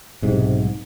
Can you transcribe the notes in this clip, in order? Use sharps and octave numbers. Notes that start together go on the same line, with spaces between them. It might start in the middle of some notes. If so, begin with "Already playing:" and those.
B1 G#2 C3